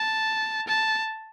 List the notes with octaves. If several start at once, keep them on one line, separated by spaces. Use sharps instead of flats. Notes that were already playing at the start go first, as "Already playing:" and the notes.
Already playing: A5
A5